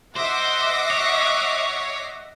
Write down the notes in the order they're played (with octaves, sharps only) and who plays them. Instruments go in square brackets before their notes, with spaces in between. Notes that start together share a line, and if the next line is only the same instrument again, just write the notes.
[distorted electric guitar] C5 [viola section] D#5 E5 F#5 [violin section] D6 A#6 C7
[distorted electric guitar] C#5